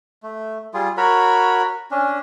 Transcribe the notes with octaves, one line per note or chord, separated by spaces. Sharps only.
A3
G3 F4 G#4
F#4 A#4 C#5 B5
C#4 D4